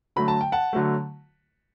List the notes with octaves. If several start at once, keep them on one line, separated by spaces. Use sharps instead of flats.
D3 F#3 A3 B5
A5
G5
F#5 A5
D3 F#3 A3